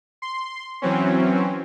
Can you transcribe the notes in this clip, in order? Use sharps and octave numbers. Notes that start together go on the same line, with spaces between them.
C6
E3 F#3 C4 C#4